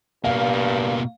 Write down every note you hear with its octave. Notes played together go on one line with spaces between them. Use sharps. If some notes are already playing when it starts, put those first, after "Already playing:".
G2 B2 A#3 F5